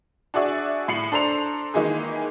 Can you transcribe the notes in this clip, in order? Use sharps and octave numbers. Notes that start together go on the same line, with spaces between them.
D4 F#4 G#4 D5 E5 C#6
A2 C7 C#7 F#7
D4 A4 C5 A#5 C7 F7
D#3 E3 G#3 A#3 D#4 G#4